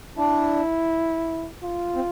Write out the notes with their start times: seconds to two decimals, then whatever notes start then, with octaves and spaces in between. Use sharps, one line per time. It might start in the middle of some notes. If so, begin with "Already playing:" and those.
0.18 D4 E4
1.63 F4
1.95 C4